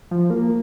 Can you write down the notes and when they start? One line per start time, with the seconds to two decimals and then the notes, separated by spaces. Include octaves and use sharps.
0.11 F3
0.30 A#3